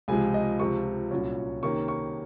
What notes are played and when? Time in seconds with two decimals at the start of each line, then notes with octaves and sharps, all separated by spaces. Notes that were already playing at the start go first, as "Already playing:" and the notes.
0.08 C#2 C3 F3 G#3 G#5
0.34 D#5
0.60 C#2 C3 F3 C#6
1.11 C2 A#2 F#3 C#4
1.63 C3 D#3 A#3 C#4 C#6
1.88 C#6